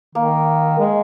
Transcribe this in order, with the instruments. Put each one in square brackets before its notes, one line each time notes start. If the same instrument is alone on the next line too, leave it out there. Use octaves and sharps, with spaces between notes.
[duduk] D#3 [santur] A#3
[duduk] G#3